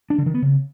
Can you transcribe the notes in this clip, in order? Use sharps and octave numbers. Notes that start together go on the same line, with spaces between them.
D4
D3
D#3
B3
C#3